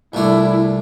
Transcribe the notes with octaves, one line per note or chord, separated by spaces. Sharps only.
C2 A#2 A3 D4 E4